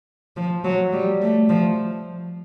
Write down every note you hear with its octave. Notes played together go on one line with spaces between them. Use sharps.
F3
F#3
G3
A3
F3